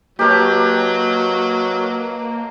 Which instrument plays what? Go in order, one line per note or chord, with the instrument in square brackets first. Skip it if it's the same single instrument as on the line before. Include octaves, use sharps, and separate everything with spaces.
[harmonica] F#3 [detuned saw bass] A#3 [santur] G4 A#4 C#5 [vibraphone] B4 D#5 A5